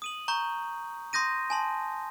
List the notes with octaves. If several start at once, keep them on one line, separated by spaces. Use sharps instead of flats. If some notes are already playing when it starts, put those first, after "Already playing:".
D#6 D#7 F#7
A#5 C#6 G6
C6 D#6 G6 A#6 D#7
G#5 A5 C6